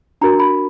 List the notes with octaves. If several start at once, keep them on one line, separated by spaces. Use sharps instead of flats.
D4 F#4 A#4 A#5
B5